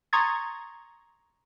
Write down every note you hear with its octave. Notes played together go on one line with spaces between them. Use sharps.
A#5 C6 C#6 D#6 G#6 A6